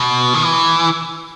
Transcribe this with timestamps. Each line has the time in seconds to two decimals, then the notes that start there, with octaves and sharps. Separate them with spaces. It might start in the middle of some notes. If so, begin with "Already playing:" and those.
Already playing: B2
0.34 D#3
0.43 E3